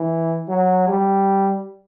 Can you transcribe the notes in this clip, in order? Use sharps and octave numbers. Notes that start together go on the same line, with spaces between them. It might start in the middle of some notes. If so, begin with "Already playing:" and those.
Already playing: E3
F#3
G3